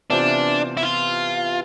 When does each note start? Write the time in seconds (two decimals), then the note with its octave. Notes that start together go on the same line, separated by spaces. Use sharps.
0.10 C3 E3 B3 D4 F4 C5
0.77 E4
0.83 F4